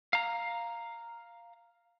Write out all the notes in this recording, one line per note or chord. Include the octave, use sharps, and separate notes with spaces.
F5 A#5